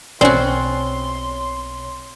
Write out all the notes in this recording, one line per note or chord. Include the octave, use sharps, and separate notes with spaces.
B1 B2 C4 C#4 F#4 C#5 D5 C6